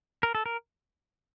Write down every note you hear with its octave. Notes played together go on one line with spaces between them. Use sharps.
A#4
A4
A#4